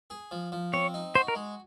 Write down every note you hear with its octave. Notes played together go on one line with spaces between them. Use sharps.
G#4
F3
F3
C4 C#5
D#4
F#4 C5
A#4
G#3